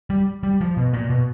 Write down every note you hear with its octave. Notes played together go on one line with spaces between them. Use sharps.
G3
G3
F3
B2
A#2
B2